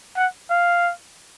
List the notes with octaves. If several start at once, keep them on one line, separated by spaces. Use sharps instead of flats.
F#5
F5